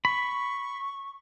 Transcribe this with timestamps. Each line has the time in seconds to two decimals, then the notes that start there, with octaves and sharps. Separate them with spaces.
0.05 B5 C#6